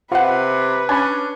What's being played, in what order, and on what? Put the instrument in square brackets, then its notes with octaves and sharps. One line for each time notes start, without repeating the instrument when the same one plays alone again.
[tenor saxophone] C3 [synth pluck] F4 F#5 [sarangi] B4
[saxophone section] C#4 [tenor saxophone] D4 [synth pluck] G#5 B5